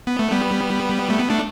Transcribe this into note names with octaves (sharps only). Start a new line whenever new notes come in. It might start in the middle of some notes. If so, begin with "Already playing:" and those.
B3
A3
G3 B3
A3
B3
A3 D4